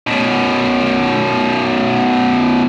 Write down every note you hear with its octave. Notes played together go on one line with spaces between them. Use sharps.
F#2 B2